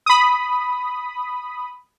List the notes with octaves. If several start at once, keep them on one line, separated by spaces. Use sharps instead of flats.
B5 D#6